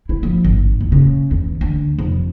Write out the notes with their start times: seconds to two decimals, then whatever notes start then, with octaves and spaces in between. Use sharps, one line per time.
0.09 E4
0.23 F3
0.45 G#1
0.81 E2
0.92 C#3
1.31 E2
1.61 D2
1.99 F1